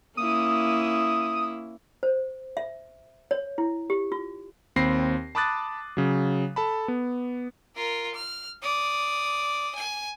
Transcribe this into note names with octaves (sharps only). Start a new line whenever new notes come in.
A#3 C#4 E4 D#6
C5
E5
C#5
E4
G4
F4
D#2 C4 B5 A#6 C7
A5 B5 D6 D#6 F#6 A6
C#3 F#3
A4 A5 B5
B3
F4 A#4
F6
D5 D#6
G#5